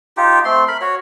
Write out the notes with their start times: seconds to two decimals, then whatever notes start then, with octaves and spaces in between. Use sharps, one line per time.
0.17 D#4 F4 G4
0.45 A3 C4 C6
0.68 A#4 B5
0.81 F#4 C#5